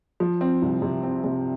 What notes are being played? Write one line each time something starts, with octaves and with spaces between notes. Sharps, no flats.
F3
C4
C2
C3
C4
C3